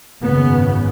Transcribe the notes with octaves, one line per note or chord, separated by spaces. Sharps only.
G#1 F#2 C#3 B3